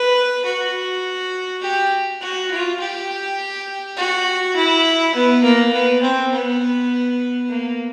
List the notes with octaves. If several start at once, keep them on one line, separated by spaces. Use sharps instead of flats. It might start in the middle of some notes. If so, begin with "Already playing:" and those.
Already playing: B4
F#4
G4
F#4
F4
G4
F#4
E4
B3
A#3
B3
C4
B3
A#3